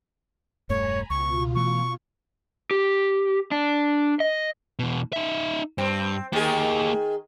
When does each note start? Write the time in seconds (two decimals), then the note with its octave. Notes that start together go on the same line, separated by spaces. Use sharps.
0.70 E1 G2 A3 C#5 G#5 A#5 B5
1.10 C#2 B2 F4 C#6
1.55 E3 A3 C#6
2.71 G4
3.51 D4
4.20 D#5
4.79 E2 B2
5.13 D#4 E5
5.78 G2 C4
6.33 D#3 A#3 G4 G#4